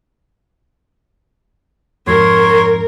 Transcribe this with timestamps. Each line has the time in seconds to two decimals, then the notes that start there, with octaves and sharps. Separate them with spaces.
2.07 F2 G#2 A#4 C#5 C6